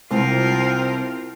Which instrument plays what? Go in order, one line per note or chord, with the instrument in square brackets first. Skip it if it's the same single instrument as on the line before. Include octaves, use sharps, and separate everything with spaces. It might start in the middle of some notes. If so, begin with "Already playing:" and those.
[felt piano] C2 [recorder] C4 [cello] F4 A#4